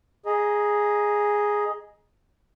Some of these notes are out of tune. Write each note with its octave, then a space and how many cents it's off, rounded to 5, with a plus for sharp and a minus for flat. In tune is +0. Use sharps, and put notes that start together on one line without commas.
G#4 +0 D#5 +0 A#5 +20